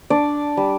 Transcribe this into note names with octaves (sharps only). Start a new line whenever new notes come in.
D4 D5
G3